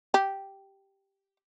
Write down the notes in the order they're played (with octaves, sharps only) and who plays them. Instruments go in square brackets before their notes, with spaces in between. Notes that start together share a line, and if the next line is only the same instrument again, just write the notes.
[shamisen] G4